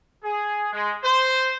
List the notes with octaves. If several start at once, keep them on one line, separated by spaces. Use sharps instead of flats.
G#4
G#3
C5